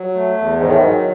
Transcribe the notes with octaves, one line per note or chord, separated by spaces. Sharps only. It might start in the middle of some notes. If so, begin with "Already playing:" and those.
Already playing: F#3
A3
E2
G#2 D#3
A2
G#2 F#3